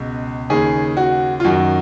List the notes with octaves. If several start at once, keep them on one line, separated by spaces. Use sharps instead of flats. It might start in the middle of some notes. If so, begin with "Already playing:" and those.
Already playing: C#2 B2
D#2 C#3 G#4
F#4
F4
F#2 D#3 F#4